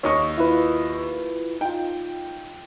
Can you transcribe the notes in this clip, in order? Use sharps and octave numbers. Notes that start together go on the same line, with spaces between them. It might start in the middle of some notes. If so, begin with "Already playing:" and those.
D#2 D#4 C#5 C#6
E4 F4 B4
D#4 F4 G5